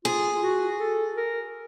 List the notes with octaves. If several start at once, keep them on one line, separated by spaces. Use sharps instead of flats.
F4 G#4
F4
F#4
A4
A#4